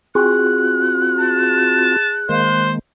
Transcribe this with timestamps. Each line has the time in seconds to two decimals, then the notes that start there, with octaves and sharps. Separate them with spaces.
0.15 C4 F4 F#4 G#4 F#6
1.19 A5
2.29 D#3 G#3 A#3 C5